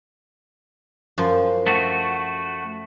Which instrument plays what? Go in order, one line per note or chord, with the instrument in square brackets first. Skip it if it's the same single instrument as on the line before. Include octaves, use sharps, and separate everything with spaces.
[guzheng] F#2 F3 C5
[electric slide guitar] A3 F#4